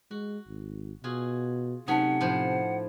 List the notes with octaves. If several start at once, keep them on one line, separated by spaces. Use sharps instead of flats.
G#3 F#4
G#1
B2 F4 F#4 G#4
C3 F#3 A3 C#4 D#4 F#5 A5
A2 F3 C5